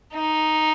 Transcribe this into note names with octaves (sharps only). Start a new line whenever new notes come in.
D#4